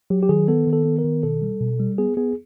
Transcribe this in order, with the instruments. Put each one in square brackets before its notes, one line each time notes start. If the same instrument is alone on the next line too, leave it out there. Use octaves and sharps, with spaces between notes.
[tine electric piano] F#3 G4
G4
D#3 G#4
B3 A4
D#3
A4
B3
A#4
D#3
B2 A4
G3
B2
G3
B3 G#4
B3 G#4